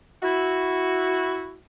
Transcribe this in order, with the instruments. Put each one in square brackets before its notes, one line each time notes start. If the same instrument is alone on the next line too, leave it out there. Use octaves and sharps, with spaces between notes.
[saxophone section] E4 F#4